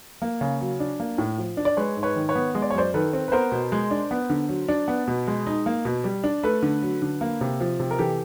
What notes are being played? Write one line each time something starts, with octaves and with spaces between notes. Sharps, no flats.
A#3
C#3
F#3
D4
A#3
A2
F3
D4
D5
G#3 B4 C#5
G#2
B4 C#5
D#3
B4 C#5
B3
G#3 D#5
D5
C#5
F#2 C5 D5
D#3 A4 B4
C4
B4
B3 A#4 C5
B2
G#3
D4
B3
D3
F#3
D4
B3
B2
G#3
D#4
A#3
B2
G3
D4
A3 A4 B4
D3
F#3
D3
A#3
C3
F3
C3
A#4
E3 G4 A4